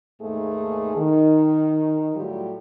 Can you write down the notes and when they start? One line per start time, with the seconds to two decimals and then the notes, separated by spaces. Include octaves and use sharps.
0.22 D#2 G#2 A3 A#3 G#4
0.97 D#3
2.16 A2 F#3 G3 F4 G4